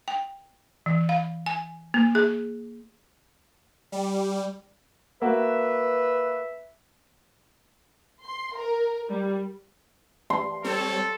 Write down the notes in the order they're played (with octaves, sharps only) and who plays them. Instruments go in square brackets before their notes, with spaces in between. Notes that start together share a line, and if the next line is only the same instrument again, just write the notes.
[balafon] G5
E3
F5
G#5
A#3
G#4
[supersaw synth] G3
[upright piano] A#3 F#4 [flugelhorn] B4 [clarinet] E5
[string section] C6
A#4
G3
[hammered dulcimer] C6
[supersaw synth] G3 C4 C#5 [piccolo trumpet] A4